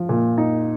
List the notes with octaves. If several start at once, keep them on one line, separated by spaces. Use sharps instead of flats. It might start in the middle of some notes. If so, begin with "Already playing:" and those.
Already playing: F3
A#2
D#4